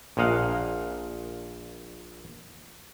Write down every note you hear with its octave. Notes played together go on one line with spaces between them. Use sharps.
A#1 A#2 D#5 F5 F#5